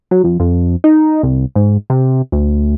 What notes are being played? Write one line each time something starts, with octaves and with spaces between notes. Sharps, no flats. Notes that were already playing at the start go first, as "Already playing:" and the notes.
F#3
F2
F2
D#4
C2
G#2
C3
D2